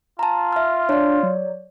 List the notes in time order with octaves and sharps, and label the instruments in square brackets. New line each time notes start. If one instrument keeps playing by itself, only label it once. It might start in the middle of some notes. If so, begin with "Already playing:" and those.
[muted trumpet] F4 [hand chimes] A5 A#5
[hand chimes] E5 F6
[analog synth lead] D4 [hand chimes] C#5 D5
[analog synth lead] F#3